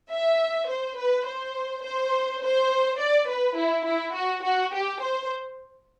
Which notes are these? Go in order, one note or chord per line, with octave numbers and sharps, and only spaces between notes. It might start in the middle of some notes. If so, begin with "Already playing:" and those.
E5
C5
B4
C5
C5
C5
D5
B4
E4
E4
F#4
F#4
G4
C5